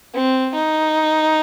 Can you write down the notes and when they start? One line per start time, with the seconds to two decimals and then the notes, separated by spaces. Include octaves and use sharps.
0.14 C4
0.54 D#4